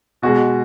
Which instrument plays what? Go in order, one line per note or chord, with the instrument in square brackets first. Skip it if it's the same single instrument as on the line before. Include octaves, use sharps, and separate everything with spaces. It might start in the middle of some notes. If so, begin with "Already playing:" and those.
[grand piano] B2 G#3 F#4